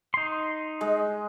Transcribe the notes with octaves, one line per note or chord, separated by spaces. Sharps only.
D#4 C6
G#3